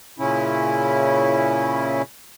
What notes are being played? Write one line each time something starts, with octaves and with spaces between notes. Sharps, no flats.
A#2 C#3 C#4 E4